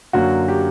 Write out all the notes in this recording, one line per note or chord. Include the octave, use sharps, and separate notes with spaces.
F#2 D3 F#3 A#3 F#4
G4